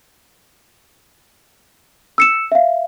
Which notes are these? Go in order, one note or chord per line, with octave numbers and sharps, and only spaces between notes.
E6 C#7 E7
E5 F5